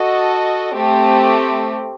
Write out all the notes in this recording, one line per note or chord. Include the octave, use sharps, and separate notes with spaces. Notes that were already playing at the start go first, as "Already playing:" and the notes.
Already playing: F#4 A4 D#5
A3 C4 G4